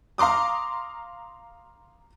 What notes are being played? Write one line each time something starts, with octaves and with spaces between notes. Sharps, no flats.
F5 A#5 C6 D6 D#6